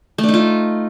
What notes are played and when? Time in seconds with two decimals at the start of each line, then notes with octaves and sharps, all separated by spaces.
0.18 A3
0.23 D4
0.29 D#4
0.34 F4